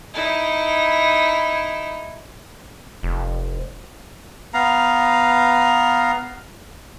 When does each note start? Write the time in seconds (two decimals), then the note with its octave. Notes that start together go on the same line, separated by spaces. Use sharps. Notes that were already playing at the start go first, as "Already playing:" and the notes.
0.14 D#4 E4
3.03 F1
4.54 B3 F5 A#5